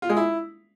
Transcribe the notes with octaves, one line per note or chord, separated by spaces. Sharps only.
F4
G#3
E4